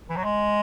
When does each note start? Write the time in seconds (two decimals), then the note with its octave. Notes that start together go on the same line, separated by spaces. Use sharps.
0.09 E3
0.17 F#3
0.24 G#3